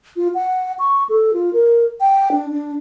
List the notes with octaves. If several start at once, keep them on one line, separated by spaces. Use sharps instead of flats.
F4
F#5
C#6
A4
F4
A#4
G5
D4
D4